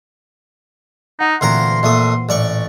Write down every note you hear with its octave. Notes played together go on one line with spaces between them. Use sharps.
D#4 F#5
D2 A#2 E3 C4 A#4 A#5 C6
A#1 A3 D#6
A1 D5 C#6